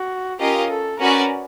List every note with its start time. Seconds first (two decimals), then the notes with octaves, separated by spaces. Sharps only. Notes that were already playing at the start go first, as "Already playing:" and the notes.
Already playing: F#4
0.39 C#4 F4 G4 A#4 D#5
0.70 A4
0.99 C#4 F#4 A#4 B4 D5